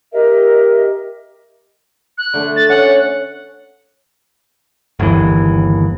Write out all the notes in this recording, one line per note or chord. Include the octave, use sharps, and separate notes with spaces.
G4 A#4 D#5 E5
F#6
D3 A3 D4
A6
C#4 F#5
G1 D#2 E3